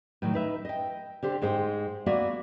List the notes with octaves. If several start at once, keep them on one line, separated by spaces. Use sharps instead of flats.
A2 D#3 F#3
D#4 B4 E5
D#5 G5
D3 G4 C5
G#2 G#3 C5 G5
A#3 B3 F#4 D5 E5